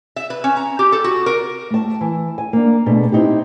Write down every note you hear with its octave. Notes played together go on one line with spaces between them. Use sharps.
E5
B4
C#4
A#5
G4
A4
F#4
A#4
A3 A5
E3
G#5
A#3 D4
B2 A3 D4 G#4
C4 D#4 E4 G4